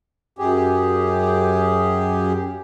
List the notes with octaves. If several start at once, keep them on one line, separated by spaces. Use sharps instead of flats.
F#2 G4 G#4